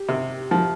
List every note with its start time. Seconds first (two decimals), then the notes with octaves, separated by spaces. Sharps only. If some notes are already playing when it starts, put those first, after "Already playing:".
Already playing: G4
0.09 C3
0.51 F3